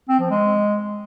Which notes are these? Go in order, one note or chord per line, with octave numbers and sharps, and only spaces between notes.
C4
F3
G#3